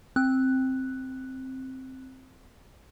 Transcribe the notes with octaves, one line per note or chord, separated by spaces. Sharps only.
C4 F#6